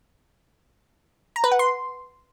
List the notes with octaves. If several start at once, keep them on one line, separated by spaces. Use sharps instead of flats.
A#5
B4
F#5
C6